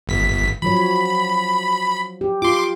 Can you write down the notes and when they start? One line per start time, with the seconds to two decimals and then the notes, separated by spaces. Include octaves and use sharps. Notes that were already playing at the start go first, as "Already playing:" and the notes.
0.07 G1 B6
0.62 F3 F#3 C#5 B5
2.21 G4
2.42 F4 C6 D6